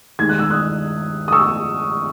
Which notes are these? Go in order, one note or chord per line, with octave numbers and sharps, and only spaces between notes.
D#2 D#3 G#3 G#6
F#6
E6
D#6 F#6
D#6
C#6 E6